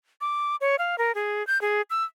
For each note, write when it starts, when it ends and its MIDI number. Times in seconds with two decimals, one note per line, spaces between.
0.21 0.56 86
0.61 0.76 73
0.79 0.98 77
0.98 1.14 70
1.15 1.45 68
1.47 1.61 91
1.62 1.82 68
1.90 2.04 88